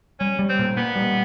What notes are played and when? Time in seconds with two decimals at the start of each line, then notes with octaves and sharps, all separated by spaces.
0.20 G3 C#4
0.39 G3
0.49 C4
0.59 A#2
0.77 A#3 B3
0.95 G3